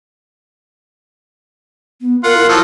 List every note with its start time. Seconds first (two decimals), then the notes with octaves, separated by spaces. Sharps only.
2.01 B3
2.24 F4 A#4 F#5
2.37 E4
2.49 F3 F#3 A4